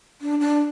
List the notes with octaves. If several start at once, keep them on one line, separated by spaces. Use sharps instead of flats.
D4
D4